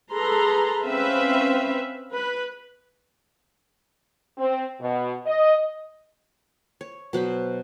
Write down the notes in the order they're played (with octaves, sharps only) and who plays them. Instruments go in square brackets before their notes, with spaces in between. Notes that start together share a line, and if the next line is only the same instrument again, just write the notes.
[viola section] G#4 A4 B4 A#5 C6
C4 C#4 B4 E5 F5
B4
[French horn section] C4
B2
D#5
[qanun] C#5
B2 F#3 C5 B5